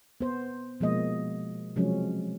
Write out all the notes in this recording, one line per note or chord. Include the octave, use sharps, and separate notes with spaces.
B3 C5
B2 F3 G#3 A#3 D#5
C3 F3 F#3 G#3 C#4